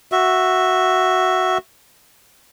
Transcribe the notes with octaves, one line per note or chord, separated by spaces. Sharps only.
F#4 E5